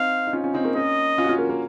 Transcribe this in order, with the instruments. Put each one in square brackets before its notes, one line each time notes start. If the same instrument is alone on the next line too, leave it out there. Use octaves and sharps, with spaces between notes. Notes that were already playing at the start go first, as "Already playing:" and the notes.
Already playing: [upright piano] C4 D#4 [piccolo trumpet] F5
[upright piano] D#4
C#4 F4
C#4 F4
C4 D#4
A#3 C#4
[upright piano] A#3 C#4 [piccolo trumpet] D#5
[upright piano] C#4 F4
F#4
C#4 F4
A#3
A#3